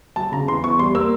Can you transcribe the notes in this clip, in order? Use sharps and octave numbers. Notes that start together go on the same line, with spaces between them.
F#3 A5
C#3 A#5
E2 C6
E2 C#6
G3 C6
A#3 E6